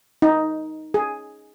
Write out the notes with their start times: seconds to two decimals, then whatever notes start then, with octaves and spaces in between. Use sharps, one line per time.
0.22 D#4
0.94 G#4